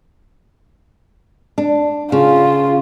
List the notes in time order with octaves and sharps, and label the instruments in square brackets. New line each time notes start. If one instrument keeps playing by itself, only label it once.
[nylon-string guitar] D4
[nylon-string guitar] C#3 [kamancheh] F4